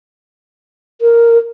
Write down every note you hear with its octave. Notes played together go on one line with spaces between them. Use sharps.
A#4